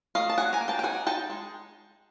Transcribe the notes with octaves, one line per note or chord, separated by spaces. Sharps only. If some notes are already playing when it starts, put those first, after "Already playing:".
A3 D#5 F5
A5
D4 F#5 G#5
G#5 A#5
A#3
G5 A5
G5
D#4 F#5 G#5
D#4 G5 A5
G#3